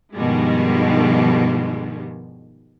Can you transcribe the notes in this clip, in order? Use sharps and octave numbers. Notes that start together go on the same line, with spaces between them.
G2 B2 D#3 F3 G3 G#3